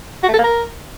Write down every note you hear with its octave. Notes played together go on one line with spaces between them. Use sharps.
F#4
A3
A4
A#3
A#4